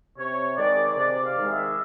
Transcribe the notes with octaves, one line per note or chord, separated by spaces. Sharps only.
C3 C#5
D#3 G#3 D5
C3 D5
F5
D#3 G#3
E5